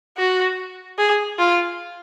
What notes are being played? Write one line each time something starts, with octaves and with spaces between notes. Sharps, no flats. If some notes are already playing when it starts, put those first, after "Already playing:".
F#4
G#4
F4